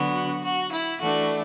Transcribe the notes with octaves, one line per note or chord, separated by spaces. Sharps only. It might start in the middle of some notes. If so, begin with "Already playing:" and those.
Already playing: D3 F#3 B3 F#4
F#4
E4
E3 A3 D4 F#4